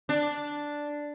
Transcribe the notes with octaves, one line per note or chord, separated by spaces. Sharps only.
D4